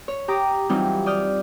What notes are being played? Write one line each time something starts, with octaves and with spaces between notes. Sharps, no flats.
C#5
G4 A#5 D6 D#6
E3 F#3 G3 C4 D#4 F4
D5 D#6 F6 G6